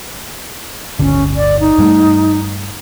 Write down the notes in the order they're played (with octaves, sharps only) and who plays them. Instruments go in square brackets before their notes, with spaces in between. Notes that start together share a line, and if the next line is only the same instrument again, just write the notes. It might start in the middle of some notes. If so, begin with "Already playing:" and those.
[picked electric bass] D1 G1 D3 [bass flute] C#4
[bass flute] D5
D#4
[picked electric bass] G2 G3 A3